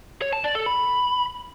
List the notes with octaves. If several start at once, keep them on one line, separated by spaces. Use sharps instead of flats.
C#5
A5
D5
A4
B5